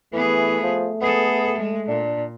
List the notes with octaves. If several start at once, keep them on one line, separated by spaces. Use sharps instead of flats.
E3 A3 B3 G#4
F3
B3 G#4 A4
G#3
A#2 D4